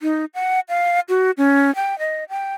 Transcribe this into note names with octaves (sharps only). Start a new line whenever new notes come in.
D#4
F#5
F5
F#4
C#4
G5
D#5
G5